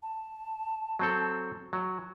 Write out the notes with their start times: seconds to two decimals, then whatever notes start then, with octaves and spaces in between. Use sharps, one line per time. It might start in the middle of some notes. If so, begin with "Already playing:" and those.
0.03 A5
0.99 F#3 C4 A4
1.73 F#3